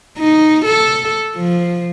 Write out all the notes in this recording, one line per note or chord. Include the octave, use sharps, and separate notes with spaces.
D#4
A4
F3